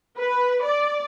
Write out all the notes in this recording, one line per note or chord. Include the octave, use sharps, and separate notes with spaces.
B4
D5